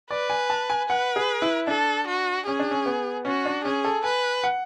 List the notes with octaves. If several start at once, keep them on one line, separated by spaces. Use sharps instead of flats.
B4 D5
G#5
A5
G#5
B4 F#5
G#4
E4
D4 A4
F#4
C#4 G#4
D4
C#4
B3
C#4 F#4
D4
C#4 G#4
A4
B4 G#5
F#5